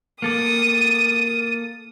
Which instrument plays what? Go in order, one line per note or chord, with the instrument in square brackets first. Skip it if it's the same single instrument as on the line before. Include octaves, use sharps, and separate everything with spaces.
[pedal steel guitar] A#3 A4 D6 [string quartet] D#6